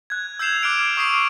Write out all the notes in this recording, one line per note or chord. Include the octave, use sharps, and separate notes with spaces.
F#6 G#6
E6 G6 G#6 C7 E7 F7
D6 F6 F#6 D7 E7
C#6 D#6 E6 C7 D7